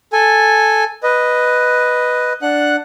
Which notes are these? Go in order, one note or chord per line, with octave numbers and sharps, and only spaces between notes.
A4 G#5
B4 D#5
D4 F#5 F#6